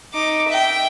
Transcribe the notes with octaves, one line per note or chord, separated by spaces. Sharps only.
D#4 D6
E5 G5